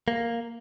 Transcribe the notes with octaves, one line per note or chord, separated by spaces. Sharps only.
A#3